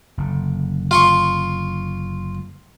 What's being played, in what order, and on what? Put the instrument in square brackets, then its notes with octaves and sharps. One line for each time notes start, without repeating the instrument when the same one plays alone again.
[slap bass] F#1 D3
[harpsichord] F4 C6 C#6